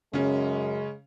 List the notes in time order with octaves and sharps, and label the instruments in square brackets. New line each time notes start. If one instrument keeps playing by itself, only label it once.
[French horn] F#2 [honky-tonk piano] C#3 C#4 [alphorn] G#3